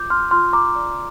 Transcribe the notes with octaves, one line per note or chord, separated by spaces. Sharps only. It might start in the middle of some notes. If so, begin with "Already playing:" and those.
Already playing: F4 D6 G6
C6 F6
F4 C6 F6
A#5 D6
D5